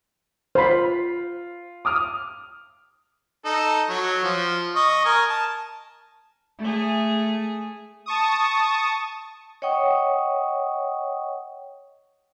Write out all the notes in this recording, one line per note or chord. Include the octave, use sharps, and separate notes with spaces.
F4 C5 B5
D6 D#6 F6
D#4 A4
F#3 C#5
F3
D#5 C#6
A#4 G#5
A5
A3 G#4
A5 C#6 D#6
C#5 D#5 F#5 G5 C#6 D#6